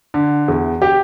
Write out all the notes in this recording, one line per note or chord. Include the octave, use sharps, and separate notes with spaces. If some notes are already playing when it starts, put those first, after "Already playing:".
D3
E2
G4